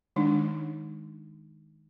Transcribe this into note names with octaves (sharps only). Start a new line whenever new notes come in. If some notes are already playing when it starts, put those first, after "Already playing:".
D#3 G#3 D4 D#4